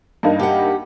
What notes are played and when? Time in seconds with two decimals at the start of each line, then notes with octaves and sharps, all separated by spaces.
0.23 G2 A#3 D#4
0.39 G4 F#5